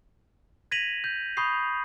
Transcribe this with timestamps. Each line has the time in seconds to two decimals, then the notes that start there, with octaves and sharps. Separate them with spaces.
0.71 G#6 A#6 B6 D#7 F7 F#7
1.04 G6
1.37 B5 C#6 D#6 G6 C7